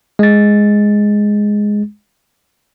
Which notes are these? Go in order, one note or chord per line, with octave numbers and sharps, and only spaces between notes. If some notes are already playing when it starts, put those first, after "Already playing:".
G#3 A6